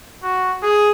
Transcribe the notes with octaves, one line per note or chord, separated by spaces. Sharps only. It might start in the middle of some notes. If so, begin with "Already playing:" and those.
F#4
G#4